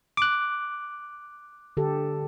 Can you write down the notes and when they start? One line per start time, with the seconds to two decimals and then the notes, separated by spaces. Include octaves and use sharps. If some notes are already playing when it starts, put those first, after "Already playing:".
0.17 D6 F#6
1.77 D3 G4 A4